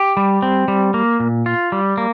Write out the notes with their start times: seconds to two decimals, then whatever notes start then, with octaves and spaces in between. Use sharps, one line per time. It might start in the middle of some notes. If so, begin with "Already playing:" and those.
Already playing: G4
0.17 G3
0.42 C4
0.68 G3
0.94 A#3
1.20 A#2
1.46 F4
1.72 G3
1.98 A#3